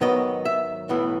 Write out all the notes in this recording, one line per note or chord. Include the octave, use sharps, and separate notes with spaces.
G#2 D#3 F#3 B3 D#5
E5
B1 A2 E3 B3